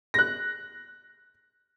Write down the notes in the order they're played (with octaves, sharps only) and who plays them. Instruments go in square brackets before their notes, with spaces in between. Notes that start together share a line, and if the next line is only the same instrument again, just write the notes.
[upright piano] F#6 A#6